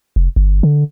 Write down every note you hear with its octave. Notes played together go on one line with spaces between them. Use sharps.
F1
G1
D3